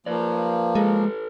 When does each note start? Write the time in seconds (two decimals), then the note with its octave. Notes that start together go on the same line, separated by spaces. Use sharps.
0.06 F3 A#3 B4 D5
0.75 G#3 A4 B4